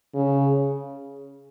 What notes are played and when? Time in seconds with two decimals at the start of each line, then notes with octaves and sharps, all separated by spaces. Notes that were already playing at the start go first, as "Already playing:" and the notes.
0.14 C#3